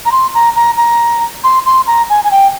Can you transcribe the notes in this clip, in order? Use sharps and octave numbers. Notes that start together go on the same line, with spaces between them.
A#5
C6
A#5
A#5
A#5
C6
C6
A#5
G#5
G#5
G5